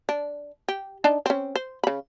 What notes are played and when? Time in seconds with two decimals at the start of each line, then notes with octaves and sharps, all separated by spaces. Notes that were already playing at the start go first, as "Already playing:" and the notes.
0.09 D4
0.68 G4
1.04 D4 D#4 A5
1.26 C4 C#4
1.56 C5
1.83 C#3 B5